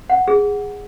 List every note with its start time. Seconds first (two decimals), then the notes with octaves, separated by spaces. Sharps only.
0.10 F#5
0.28 G#4